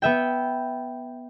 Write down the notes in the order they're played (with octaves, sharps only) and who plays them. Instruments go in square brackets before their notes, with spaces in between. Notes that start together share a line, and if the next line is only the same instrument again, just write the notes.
[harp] B3 E5 G5